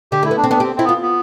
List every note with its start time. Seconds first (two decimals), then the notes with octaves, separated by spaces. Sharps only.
0.12 D3 G4
0.23 A3 E4
0.31 B3
0.37 D4
0.44 C4
0.50 B3 D4
0.60 C4 G4
0.76 C4 E4
0.85 B3
0.89 F4
1.02 B3